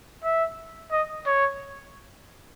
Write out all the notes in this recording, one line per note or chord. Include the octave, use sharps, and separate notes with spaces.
E5
D#5
C#5